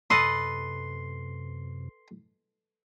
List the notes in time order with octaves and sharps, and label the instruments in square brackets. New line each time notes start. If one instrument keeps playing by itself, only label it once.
[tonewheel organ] F#2 C3 [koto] A4 B4 D#5 [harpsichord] C6